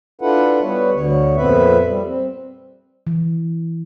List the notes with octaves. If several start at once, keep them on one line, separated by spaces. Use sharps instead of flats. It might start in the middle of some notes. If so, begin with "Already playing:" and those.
D4 E4 F4 A4 B4 F#5
G3 B3 B4 C#5
D2 D3 C#5
F2 A#2 B3 C4 B4 E5
G3
C4
E3